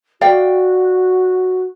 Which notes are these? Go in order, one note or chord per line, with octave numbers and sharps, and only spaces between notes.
F#4 D5 F5 G5